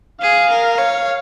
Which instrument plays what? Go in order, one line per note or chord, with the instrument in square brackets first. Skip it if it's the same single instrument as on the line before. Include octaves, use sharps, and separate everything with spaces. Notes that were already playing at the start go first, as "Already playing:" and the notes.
[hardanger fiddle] G#4 [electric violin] F5
[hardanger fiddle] A#4
[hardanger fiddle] C#5 [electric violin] F5